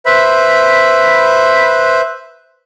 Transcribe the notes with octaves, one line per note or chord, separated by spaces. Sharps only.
B4 C5 E5 B5